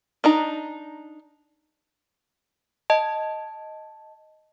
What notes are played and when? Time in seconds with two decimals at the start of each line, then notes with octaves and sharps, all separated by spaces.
0.24 D4 D#4 A#5
2.90 D#5 A5